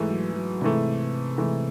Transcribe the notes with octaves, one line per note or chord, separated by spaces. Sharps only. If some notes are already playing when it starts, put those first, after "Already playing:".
Already playing: G#2 E3 A3
F#3
F#3
G#2 C3 E3 A3
G#2 E3 A3